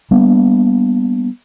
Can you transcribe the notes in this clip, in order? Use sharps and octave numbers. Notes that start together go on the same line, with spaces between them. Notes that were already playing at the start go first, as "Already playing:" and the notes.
G3 A#3 B3 D4